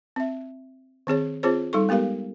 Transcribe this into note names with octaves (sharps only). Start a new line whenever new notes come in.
C4 E5
D#3 C4 G#4 C#5
C4 F4 G#4 C5 C#5
G3 D#4 A4 C#6
G#3 B3 G4 A#4 F5